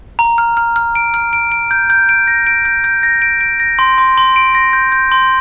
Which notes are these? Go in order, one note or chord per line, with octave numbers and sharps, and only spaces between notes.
A#5
F6
F6
F6
D7
F6
D7
D7
G6
G6
D7
A#6
D7
G6
G6
A#6
D7
D7
A#6
C6
C6
C6
D7
A#6
G6
G6
C6